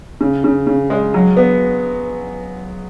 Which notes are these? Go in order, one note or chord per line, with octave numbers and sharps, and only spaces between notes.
C#3
C#3
C#3
G#3
F#3
B3